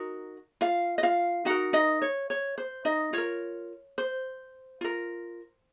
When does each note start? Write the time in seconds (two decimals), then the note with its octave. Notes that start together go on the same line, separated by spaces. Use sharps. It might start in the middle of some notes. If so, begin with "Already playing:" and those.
Already playing: D#4 F#4 A#4
0.61 F4 F5
0.98 D#5
1.03 F4 F5
1.45 D#4 F#4 A#4 F#5
1.73 D#4 D#5
2.02 C#5
2.30 C#5
2.58 C5
2.85 D#4 D#5
3.13 F4 A#4 C#5
3.98 C5
4.81 F4 A#4